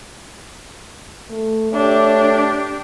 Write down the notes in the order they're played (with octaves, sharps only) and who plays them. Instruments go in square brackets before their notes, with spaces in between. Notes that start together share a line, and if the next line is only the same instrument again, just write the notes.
[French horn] A3
[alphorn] A3 [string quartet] D4 G4 [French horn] C#5